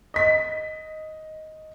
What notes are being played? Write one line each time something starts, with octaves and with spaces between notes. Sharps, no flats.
D#5 B6